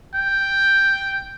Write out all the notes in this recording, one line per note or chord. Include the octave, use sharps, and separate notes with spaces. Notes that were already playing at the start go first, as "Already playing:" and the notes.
G5